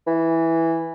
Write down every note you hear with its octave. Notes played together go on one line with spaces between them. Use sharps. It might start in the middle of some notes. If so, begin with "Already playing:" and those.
E3